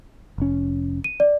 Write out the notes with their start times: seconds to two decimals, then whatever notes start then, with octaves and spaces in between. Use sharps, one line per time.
0.38 F1 C#4
1.04 D#7
1.20 D5